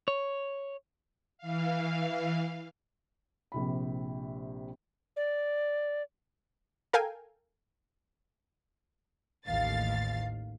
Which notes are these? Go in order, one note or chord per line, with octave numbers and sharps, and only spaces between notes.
C#5
E3 F5
A#1 C3 B5
D5
A4 A#4 F5 G5 G#5
A1 D#2 F5 A6